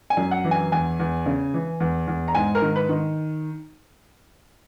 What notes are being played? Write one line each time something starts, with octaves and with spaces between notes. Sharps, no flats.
G#5
F#2
F#5
E3
G#5
E2 G#5
E2
C#3
E3
E2
E2
A#5
G#2 G#5
A#4
D#3
B4
D#3